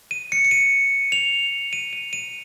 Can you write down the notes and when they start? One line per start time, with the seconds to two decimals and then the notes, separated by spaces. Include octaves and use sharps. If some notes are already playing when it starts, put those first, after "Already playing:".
0.11 D#7
0.32 C#7
0.45 C#7
0.51 D#7
1.12 F7
1.73 D#7
1.93 D#7
2.13 D#7